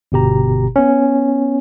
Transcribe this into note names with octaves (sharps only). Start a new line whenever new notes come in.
G1 B2 G4 A#5
B3 C#4